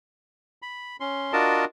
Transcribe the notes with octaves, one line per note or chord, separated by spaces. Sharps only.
B5
C#4 C6
D4 F4 F#4 A#4 D#5 A5